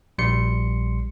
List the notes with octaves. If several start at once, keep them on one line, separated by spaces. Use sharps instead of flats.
A#1 G3 C6 C#7